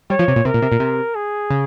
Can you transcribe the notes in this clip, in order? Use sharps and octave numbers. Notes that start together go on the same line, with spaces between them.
G3 C#5
F3
C3
A#2
C3 A#4
A#2
C3
A#2
C3
G#4
C#3